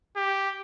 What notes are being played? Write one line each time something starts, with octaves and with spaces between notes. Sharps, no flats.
G4